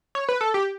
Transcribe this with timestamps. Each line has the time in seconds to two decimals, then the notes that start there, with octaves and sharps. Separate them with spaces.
0.15 C#5
0.29 B4
0.41 A4
0.54 G4